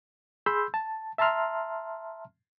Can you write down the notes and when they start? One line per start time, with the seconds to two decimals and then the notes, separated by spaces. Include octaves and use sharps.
0.46 G#4 B5 C6 E6 G6
0.74 A5
1.18 E5 A5 A#5 C6 F6